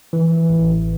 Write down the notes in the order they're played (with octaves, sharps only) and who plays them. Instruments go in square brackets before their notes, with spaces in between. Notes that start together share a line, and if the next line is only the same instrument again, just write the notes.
[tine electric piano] E3
A1